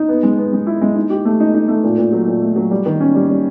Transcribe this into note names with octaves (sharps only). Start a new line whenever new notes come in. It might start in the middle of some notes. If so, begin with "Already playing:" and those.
Already playing: D#4
B3
G#3
B3
G#3
E4
G#3
D#4
G4
A3
D#4
D#4
A3
A#2
A#2
F#3
A#2
A3
F#3
G3
D#3
C#4
G3
G3